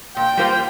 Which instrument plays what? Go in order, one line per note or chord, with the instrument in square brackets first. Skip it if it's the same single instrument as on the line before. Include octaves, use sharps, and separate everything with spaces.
[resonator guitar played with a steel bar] A#2 [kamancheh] G5
[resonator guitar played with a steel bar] G3 A#3 F4 C5